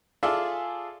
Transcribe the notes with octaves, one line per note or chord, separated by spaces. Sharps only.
F4 G#4 A4 D5 E5